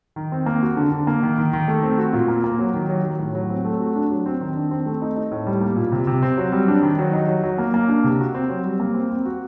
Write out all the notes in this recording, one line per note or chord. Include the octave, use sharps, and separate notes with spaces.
D#3
C4
A#3
F#4
D3
D3
A#3
D#3
D#3
D#3
A3
C4
F#4
A#2
A#3
A#3
F#3
D#3
F#3
F#3
A2
F#3
C4
A3
F#4
D4
F#3
C4
D#3
D4
C4
A3
D#4
D#4
A2
G3
A#3
A#2
C3
C3
C4
F#3
G3
D4
D#3
F#3
D#4
F#3
F#3
A#3
A#3
D4
C3
F#4
C4
F#3
G3
A#3
C4
C4
F#4